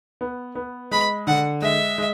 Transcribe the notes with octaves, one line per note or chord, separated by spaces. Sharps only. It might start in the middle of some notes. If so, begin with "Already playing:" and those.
B3
B3
G#3 B5
D3 F#5
G#3 E5
G#3